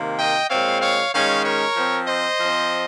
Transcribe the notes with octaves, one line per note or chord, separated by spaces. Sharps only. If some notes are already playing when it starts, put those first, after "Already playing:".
Already playing: C3 D#3 A#3
D#5 G5
A#2 G#3 C4 C#5 F5
C#5 F5
D#3 G#3 C#4 C#5 F5
A#4 C#5
F3 C4
C5 D#5
F3 C4